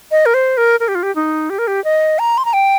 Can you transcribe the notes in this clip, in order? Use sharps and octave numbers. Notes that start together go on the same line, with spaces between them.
D#5
A#4
C5
A#4
A#4
G4
F4
G4
D#4
G4
A#4
G4
D#5
A#5
C6
A#5
G5